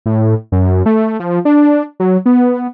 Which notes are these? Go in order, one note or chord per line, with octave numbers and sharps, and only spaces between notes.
A2
F#2
A3
F3
D4
F#3
B3